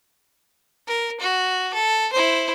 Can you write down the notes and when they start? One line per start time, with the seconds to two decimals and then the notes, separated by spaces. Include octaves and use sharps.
0.87 A#4
1.20 F#4
1.74 A4
2.13 E4 C5